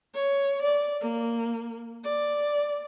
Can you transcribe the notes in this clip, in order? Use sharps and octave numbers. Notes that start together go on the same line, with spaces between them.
C#5
D5
A#3
D5